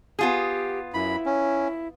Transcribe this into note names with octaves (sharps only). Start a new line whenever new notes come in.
B3 F4 G4 G#4
F#2 E4 B5
C#4